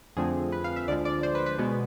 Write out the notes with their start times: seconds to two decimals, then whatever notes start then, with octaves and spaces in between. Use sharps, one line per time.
0.17 F2 D3 F3 A3 C4 G#4
0.52 B4
0.64 F5
0.76 E5
0.88 D2 D3 F3 G#3 D5
1.05 D5
1.23 C5
1.35 B4
1.46 B4
1.58 B2 G#3 B3